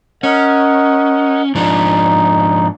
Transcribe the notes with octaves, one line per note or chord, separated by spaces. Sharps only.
C#4 A#4 D#5 F#5
G#2 F3 D4 D#4